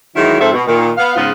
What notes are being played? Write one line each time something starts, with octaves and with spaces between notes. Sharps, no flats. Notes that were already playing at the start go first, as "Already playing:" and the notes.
D#3 E3 F#3 G#3 E4
G#2 F3 C4 A4 E5
B2
A#2 D#3
B3 F5
G#2 C#3 B3 F4